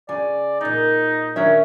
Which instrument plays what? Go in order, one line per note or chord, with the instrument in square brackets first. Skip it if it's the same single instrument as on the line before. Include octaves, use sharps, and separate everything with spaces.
[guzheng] C#3 [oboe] D5 [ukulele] G#5
[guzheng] A#2 D5 [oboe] D#4
[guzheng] D#3 [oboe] C#4 [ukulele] D4 A#4 E5